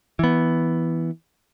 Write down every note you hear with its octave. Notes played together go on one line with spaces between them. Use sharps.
E3 B3